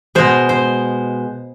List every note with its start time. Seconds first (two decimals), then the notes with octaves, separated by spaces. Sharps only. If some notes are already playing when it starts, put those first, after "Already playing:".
0.15 B2 G#3 C5
0.49 C5